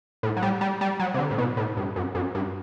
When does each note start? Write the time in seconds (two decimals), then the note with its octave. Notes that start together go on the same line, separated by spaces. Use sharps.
0.23 A2
0.37 F#3
0.42 G3
0.61 G3
0.81 G3
1.00 F#3
1.14 C3
1.19 D3
1.31 A2
1.38 B2
1.57 A2
1.77 G2
1.96 F#2
2.15 F#2
2.35 G2